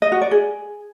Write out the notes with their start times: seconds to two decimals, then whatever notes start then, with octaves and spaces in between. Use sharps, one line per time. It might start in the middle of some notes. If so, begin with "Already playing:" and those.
0.02 D#5
0.12 F#4
0.22 D5
0.31 G#4